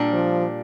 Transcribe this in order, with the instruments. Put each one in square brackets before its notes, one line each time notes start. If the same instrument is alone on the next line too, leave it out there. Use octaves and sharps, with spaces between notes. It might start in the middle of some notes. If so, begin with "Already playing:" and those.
Already playing: [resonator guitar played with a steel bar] A#2 G3 D4
[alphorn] F3